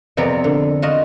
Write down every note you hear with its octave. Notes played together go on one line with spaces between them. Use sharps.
F2 C3 B3 D5 A#5
D3
F4 F#4 D#5